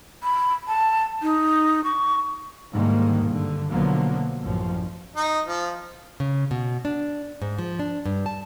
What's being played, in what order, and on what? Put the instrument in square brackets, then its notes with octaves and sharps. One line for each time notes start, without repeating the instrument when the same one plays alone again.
[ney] B5
A5
D#4
C#6
[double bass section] G#2 D3 D#3 G3 G#3 A#3
G2 D3
B1 D3 F3 F#3 A#3 B3
A1 F#2 F3
[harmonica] D#4
F3
[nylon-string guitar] C#3
B2
D4
G#2
F3
D4
G2
A5